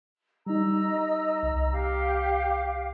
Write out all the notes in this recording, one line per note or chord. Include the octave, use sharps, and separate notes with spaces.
G3 D#4 D#5 A#5 E6
C2
G4 F5